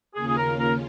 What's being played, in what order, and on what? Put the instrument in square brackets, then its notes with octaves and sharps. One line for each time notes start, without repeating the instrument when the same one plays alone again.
[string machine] D#2 C#3 A#3 C#4 F4 [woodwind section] G#4
[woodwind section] G#4
A#4
A#4